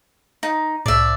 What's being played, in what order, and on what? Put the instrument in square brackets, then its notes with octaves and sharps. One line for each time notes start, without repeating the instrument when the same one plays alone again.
[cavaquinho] D#4
[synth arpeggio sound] C2 A2 [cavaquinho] D5 E5